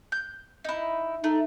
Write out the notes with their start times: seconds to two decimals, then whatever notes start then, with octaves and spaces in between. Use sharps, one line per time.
0.12 G6
0.65 D#4 E4
1.24 A3 D#4